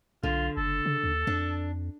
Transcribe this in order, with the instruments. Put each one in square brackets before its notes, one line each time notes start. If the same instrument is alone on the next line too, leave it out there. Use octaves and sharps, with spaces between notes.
[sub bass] B1 [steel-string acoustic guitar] D3 [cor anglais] F4
[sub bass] F#1 [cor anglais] A4
[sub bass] C#3
D#2
[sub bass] F2 [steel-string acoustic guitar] D4